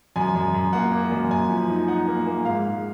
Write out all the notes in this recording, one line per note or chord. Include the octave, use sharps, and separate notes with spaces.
F#2 G#5
F#2
F#2
A#3 F#5
A#3
F#2
F#2 G#5
F3
D#4
D#4 F#5
A#3
A#3
G#2 F5
G#2